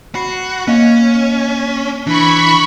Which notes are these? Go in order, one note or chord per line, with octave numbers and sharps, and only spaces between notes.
F#4 B5 C7 C#7
A#3 C#4 D#5
E3 D4 B5 C#6